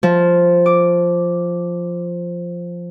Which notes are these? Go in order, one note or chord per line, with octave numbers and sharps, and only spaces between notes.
F3
D6